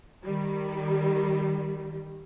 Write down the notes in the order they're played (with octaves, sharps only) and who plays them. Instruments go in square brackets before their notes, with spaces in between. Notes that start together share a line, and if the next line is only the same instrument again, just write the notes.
[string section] D#3 G3